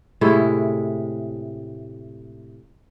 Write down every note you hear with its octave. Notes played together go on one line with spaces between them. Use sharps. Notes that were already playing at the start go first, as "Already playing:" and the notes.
A2 C3 G#3 E4